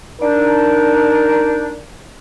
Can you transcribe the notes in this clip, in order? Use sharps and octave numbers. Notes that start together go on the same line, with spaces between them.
D4 D#4 A#4